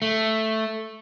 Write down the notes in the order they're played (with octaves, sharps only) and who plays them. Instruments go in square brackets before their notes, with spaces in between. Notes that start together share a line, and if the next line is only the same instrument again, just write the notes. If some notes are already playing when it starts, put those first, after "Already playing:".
[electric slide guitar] A3